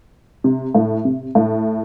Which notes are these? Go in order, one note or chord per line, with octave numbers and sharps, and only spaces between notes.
C3
A2
C3
A2